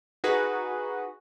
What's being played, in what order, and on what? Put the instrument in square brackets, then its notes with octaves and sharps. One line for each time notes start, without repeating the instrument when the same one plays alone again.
[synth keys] D#4 F#4 G#4 B4 D#5